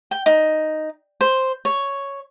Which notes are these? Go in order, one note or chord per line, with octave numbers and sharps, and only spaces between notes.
G5
D#4
C5
C#5